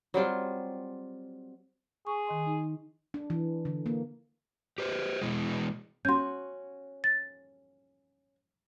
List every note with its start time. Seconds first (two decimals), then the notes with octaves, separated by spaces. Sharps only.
0.14 F#3 G3 C4 F4
2.07 G#4 C#6
2.27 D#3 D#5 C6
2.47 D#4
3.14 D4
3.30 E3
3.65 D3
3.86 A#3
4.78 G4 B4 C5
5.22 B2 E3 G#3
6.05 C#4 F#4 C6 G6
7.04 A6